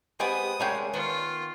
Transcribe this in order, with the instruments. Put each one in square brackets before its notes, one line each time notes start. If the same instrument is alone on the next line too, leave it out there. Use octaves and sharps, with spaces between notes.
[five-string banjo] G#3 B3 C4 [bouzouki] G4 B4 G#5 [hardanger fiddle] D#6
[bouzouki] G#3 C#4 D4 [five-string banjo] A3 A#4 G5
[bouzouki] D#3 B3 [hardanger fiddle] F4